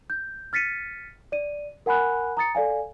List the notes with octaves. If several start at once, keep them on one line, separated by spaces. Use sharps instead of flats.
G6
F6 A6 B6 C#7 D#7
D5 D#7
A#4 F#5 G#5 B5 F#6
A#5 D#6 A6 C#7
A4 D5 F5 G#5